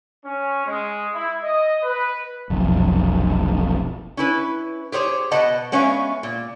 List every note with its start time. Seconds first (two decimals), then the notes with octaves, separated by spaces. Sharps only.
0.25 C#4
0.65 G#3
1.13 E4
1.42 D#5
1.83 B4
2.50 F1 B1 F2
4.17 C#4 E4 B4
4.92 G4 G#4 C5 C#5
5.31 B2 B4 D#5 F#5 A5
5.72 G#3 B3 C#4 C#5 E5 F5
6.23 A#2